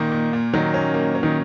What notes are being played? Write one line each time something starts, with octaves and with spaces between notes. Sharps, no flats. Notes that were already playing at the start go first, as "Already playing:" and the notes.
Already playing: A#2 D#3 A#3
A#2
A#2
D#3 F#3
C#4
A#3
C#4
D#3